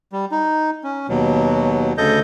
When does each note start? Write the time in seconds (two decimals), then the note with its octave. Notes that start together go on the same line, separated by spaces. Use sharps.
0.12 G3
0.31 D#4
0.84 C#4
1.09 D#2 B2 F#3
1.98 D2 C#3 A4 D#5 G6